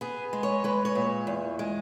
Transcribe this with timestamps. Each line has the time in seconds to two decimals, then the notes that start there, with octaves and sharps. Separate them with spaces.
0.01 B3 G#4
0.33 G#3
0.43 C#5
0.64 G#3 B4
0.85 C#5
0.95 A#2
1.27 E2
1.59 G#3